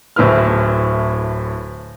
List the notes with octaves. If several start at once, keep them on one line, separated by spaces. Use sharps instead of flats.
D1 A2 E4 B4 F6